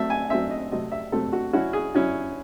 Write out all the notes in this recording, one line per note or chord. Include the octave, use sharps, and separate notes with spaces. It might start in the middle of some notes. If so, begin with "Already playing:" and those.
Already playing: F#3 A3 C4 E5
G#5
F#3 A3 C4 E5
D#5
C3 F#3 A3 C4 D#5
E5
C3 F#3 A3 C4 A4
F#4
F#3 C#4 E4 F#4
G#4
F#3 C#4 E4